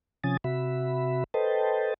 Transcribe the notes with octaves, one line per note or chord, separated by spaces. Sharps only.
C3 F3 C#4 G#5 D#6 A6
C3 F#4 E5 B5
A4 B4 C5 D#5 G5 A5